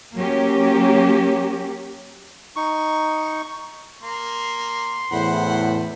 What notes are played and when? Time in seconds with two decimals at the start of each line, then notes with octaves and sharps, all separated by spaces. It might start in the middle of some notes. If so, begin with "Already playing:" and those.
0.15 F#3 A#3 C#4 G4
2.56 D#4 C#6
4.03 A#3 C6
5.12 E2 A2 C5 F#5 B5